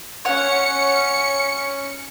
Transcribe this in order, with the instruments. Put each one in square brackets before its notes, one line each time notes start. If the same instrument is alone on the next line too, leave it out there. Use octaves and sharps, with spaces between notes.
[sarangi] C#4 [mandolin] C#5 F#5 [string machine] C#7